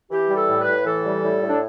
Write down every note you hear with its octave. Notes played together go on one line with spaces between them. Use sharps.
E3 G4
G3
A4
A2
B4
A2
E3 A4
G3
A2
A2
D4